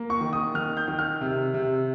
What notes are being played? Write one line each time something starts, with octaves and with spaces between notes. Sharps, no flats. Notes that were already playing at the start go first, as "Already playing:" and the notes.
Already playing: A#3
C#6
D#3
D#6
D#3 F6
G6
D#3
F6
C3
C3